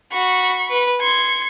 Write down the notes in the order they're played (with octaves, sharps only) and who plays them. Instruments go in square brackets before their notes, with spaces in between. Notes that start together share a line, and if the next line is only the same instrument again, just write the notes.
[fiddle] F#4 [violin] B5 C#6
[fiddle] B4
[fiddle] C6 [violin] G#6 C#7